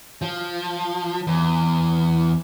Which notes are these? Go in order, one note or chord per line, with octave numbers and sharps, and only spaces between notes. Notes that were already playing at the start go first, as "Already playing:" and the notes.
F3
E2